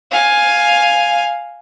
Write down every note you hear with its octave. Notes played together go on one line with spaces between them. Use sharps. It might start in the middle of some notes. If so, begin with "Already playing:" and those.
F5 G#5